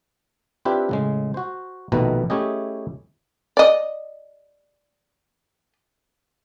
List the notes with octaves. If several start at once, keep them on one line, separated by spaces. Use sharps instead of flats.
C4 D4 E4 F4 G4 B4
A2 C#3 G#3
F#4 C5
A#1 B2 D#3 A3 B4 A#5
A3 C#4 E4 G4 G#4 D#5
D5 D#5